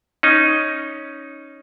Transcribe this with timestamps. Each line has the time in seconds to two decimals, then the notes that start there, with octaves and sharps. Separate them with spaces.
0.23 C#4 D#4